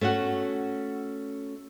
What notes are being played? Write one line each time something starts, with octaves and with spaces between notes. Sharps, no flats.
A3 C#4 F#4 F#5